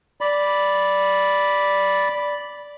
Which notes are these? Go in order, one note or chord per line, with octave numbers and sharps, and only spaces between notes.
D5 B5